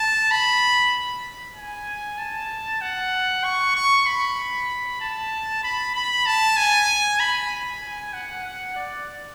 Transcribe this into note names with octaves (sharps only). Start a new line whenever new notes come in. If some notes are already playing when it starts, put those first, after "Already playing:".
Already playing: A5
B5
G#5
A5
F#5
C#6
C#6
B5
A5
B5
B5
A5
G#5
B5
G#5
F#5
F#5
D5